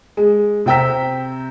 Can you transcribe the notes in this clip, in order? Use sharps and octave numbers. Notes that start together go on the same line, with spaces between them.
G#3
C3 C4 G5 A#5 E6 B6